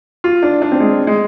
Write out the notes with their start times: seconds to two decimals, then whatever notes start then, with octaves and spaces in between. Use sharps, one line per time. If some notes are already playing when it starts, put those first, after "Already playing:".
0.24 F4
0.43 D4
0.62 D4
0.72 C4
0.80 G#3
1.07 G#3